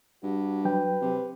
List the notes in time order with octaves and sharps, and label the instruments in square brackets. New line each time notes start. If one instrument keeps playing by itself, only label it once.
[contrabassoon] G2 [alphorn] F#4
[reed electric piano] F#3 G5 [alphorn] B4
[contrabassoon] C3